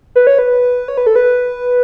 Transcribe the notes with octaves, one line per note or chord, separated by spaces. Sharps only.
B4
C#5
B4
C#5
B4
A4
B4